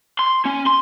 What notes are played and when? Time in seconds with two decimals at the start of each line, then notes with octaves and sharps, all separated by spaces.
0.19 C6
0.45 C#4
0.66 C6